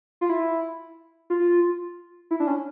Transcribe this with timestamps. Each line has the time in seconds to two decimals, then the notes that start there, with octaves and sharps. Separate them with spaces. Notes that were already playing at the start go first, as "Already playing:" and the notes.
0.21 F4
0.29 E4
1.30 F4
2.31 E4
2.40 D4
2.47 C#4